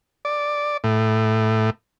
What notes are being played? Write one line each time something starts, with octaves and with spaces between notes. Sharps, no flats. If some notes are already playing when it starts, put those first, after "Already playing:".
D5
A2